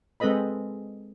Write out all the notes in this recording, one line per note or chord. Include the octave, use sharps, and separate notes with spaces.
G#3 C4 A4 B4 D#5 B5